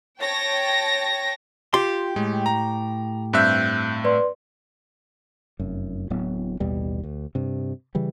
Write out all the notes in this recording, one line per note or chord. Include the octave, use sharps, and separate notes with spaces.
C#5 G5 A5 A#6
F4 G4 C6
A2 G#3
A#5
G2 C4 E5 F#6 G6
B4 D5 C6
F1 F#2
D1 A2 F#3 B3
A1 D#2 B2 G3
D2
G2 C3
C#3 E3 G3